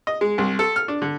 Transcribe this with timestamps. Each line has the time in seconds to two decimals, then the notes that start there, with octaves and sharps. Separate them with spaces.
0.07 D#5
0.21 G#3
0.38 C2
0.59 A4
0.76 F6
0.88 D4
1.02 D3